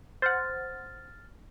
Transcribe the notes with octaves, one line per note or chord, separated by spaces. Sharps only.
C5 F#5 F6 A6